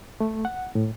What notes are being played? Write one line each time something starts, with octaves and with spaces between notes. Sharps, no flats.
A3
F#5
A2